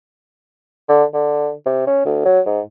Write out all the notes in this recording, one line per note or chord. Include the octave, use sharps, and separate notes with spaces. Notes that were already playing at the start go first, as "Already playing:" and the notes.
D3
D3
C3
C#4
D2
F#3
G#2